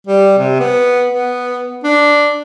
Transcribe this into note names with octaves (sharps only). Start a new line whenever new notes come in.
G3
C3
B3
B3
D4